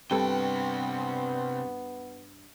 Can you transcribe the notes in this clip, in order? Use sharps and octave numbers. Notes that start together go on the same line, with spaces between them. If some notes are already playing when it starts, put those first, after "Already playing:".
C2 G2 B3 C4 A4 B4 G5